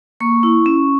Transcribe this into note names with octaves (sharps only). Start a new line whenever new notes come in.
A#3 C#6
E4
C#4